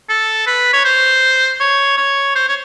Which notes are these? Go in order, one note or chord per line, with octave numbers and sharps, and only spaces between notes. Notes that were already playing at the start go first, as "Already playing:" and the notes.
A4
B4
C#5
C5
C#5
C#5
C5
C#5